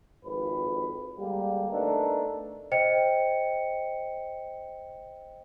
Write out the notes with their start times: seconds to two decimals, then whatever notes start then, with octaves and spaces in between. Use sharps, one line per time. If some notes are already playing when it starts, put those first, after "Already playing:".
0.24 G#1 F2 B4
1.19 D3 G3 G#3 A#3
1.71 A3 B3 D4 D#4 A4 A#4
2.72 C5 D#5 G5 C#7